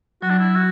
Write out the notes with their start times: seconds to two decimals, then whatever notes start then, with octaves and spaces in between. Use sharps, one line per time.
0.22 F#3 F#4
0.30 D4
0.39 E4
0.56 F#4